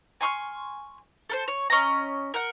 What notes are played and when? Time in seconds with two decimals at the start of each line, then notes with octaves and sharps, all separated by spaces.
0.21 G#5 C6 C#6 F6
1.29 A4 A#4 C5
1.48 C#5
1.70 C#4 D#5 A#5
2.34 A#4 F#5